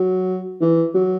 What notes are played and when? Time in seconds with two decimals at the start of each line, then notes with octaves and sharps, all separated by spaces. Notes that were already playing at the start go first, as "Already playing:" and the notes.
Already playing: F#3
0.61 E3
0.94 F#3